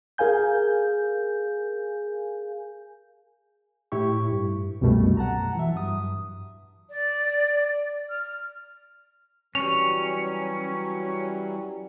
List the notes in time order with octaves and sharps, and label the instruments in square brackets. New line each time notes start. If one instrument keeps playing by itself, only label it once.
[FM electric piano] G#4 A#4 F5 G#5 G6
[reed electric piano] A2 E4 G4 C#6
G2
C2 F#2 B2 G3 A3
F#5 A5 A#5
E3 F#3 E5
G2 D#6
[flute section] D5
F6
[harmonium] E3 F#3 G3 [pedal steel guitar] C#4 [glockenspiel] F7